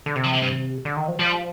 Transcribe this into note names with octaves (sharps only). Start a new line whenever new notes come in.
D3
C3
F3
D3
G2
D3
D#3
F3
F3 G3